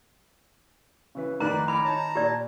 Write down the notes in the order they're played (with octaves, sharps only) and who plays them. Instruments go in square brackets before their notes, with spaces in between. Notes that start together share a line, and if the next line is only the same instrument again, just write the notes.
[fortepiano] C#3 E3 B4
[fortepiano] F2 A2 [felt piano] D#3 [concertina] B4 D5 F#6 [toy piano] A#5
[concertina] G#5 A#5 D6 [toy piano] B5
[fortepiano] D#4 C#5 [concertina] A5 A#5
[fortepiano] A#2 [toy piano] G4 D5